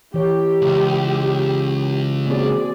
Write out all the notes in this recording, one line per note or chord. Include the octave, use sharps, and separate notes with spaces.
E3 G4 C#5
C#2
A#3 C4 F#4 G#4 D5